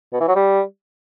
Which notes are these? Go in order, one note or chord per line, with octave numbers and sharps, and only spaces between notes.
B2
E3
F#3
G3